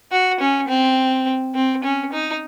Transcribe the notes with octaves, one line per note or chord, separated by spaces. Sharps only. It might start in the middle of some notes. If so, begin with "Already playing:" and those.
F#4
C#4
C4
C4
C#4
D#4